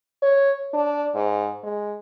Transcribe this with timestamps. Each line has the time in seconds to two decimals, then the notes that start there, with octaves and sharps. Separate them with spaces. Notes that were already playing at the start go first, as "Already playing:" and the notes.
0.22 C#5
0.74 D4
1.15 G#2
1.64 G#3